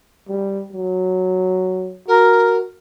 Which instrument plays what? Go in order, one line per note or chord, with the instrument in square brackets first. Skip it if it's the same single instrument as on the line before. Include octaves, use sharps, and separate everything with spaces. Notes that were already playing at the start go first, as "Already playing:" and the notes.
[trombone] G3
F#3
[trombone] F#4 [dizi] A#4